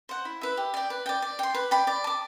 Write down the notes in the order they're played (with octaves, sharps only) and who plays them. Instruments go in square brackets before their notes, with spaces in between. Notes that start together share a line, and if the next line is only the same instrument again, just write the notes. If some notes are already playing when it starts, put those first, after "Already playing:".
[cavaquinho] C5 F#5
E4
B4 E5
G4
D5 G5
B4
D5 G5
D5
G5 C6
B4
D5 G5 B5
D5
A5 D6